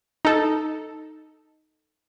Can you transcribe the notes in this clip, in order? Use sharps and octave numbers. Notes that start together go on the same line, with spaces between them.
D#4 A4